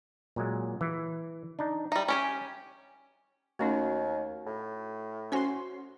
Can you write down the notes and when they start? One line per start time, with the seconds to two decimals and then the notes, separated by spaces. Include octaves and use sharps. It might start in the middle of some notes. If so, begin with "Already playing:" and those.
0.36 A#2 F#3 G#3
0.81 E3
1.59 D4 D#4
1.92 G3 D#4 E5
2.08 C#4 G4 G#5
3.59 D#2 A3 C#4 D#4 F#4
4.46 A2
5.32 C#4 F#4 C5 C#5 G#5 C6